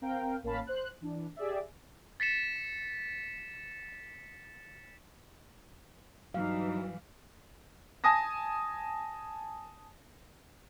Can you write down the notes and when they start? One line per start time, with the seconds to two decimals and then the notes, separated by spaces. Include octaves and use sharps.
0.02 C4 A#4 F5 G5
0.43 A1 A#3 C#4 F5 A5 B5
0.67 C5 F#6
1.01 E3 D4
1.36 G4 G#4 D5 E5
2.20 A6 B6 C#7 E7
6.34 G2 E3 F#3 D#4 F5
8.04 G#5 A5 D#6 A#6